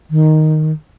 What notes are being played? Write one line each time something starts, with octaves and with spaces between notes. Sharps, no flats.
D#3